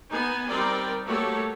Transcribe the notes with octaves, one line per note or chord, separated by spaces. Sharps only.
B3 D#4 G#5
G3 C4 D#4 A#4 D5 G5
A3 A#3 F#4 G4 A4 C#5